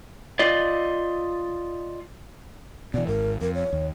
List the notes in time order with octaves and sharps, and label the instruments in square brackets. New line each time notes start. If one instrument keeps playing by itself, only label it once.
[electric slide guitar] F4 D5 D#5
[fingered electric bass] B2 E3 [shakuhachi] D5
[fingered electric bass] G#1 G#2 [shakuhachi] A#4
[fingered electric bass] F2 [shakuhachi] A#4
[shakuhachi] C#5
[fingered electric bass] D#2